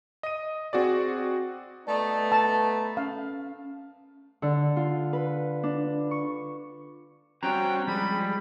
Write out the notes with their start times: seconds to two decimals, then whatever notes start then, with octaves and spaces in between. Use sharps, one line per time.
0.23 D#5 D#7
0.73 C4 F#4 G#4 D5
1.87 A3 B3 D#4 D5
2.32 A5
2.97 C#4 F5
4.42 D3
4.76 F4
5.13 B4
5.63 D4
6.11 C#6
7.43 G3 C4 C#4 F#4 F#5 G5 A#5
7.88 F3 G3 G#3 B5